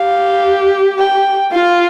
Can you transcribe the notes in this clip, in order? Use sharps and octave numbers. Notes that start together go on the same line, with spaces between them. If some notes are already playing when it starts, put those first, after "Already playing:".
Already playing: G4 F5
G5
F4 F5